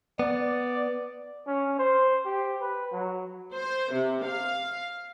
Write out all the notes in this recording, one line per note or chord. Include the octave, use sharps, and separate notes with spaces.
B3 D5
C#4
C5
G4
B4
F#3
C5
C3
F5